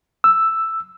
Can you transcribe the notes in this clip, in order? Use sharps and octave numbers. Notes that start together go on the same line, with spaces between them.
E6